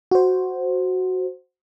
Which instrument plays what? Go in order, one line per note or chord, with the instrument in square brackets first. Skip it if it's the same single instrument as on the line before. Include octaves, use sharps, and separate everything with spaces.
[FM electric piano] F#4 C5